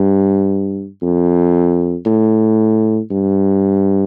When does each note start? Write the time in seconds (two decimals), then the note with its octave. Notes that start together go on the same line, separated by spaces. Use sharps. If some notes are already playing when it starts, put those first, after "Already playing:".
Already playing: G2
1.03 F2
2.06 A2
3.10 G2